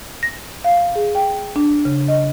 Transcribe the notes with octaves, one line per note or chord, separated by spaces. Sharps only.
A#6
F5
G#4
G5
D4
C#3
D#5